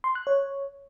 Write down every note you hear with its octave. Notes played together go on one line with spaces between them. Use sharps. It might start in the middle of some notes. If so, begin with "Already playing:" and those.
C6
F#6
C#5